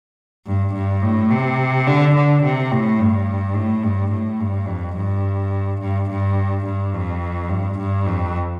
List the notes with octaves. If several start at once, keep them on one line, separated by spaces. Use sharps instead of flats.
G2
G2
A2
C3
D3
D3
C3
A2
G2
A2
G2
A2
G2
F2
G2
G2
G2
G2
F2
G2
G2
F2